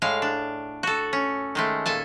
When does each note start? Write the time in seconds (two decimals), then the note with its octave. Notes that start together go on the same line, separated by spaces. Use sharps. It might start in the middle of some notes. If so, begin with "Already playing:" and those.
0.02 A2 G#3 F5
0.22 D4
0.83 F#4 A4
1.13 C#4
1.55 D#3 G#3 A3
1.86 A#2 A4 G#5 A5